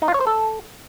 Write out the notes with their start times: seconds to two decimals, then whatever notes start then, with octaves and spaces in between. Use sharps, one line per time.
0.02 D#4
0.08 F4
0.14 C#5
0.21 C5
0.27 A4